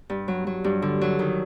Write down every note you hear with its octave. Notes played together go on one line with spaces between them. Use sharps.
G2
F#3
F#3
G2
D3
F#3
D#3